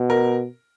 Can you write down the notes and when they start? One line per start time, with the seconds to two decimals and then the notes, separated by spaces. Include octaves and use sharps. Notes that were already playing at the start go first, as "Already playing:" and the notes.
Already playing: B2
0.10 A#4